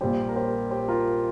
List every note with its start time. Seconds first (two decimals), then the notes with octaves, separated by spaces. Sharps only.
0.01 A#1 A#2 G3 G4 C5
0.29 A#4
0.36 G4 C5
0.71 G4 C5
0.88 F4 A#4